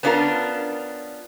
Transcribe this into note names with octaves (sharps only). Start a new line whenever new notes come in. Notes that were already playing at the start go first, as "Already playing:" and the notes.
B3 C#4 D4 F4 G4 A#4